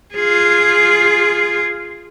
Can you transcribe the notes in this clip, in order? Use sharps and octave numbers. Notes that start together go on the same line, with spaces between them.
F4 G#4